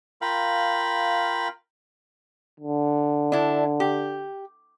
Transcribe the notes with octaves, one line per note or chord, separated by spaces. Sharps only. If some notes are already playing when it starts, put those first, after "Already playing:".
F4 A#4 F5 G5 B5
D3
D4 E4
G4